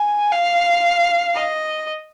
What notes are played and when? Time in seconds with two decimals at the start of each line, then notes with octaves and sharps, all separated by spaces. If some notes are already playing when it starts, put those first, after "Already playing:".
Already playing: G#5
0.31 F5
1.35 D#5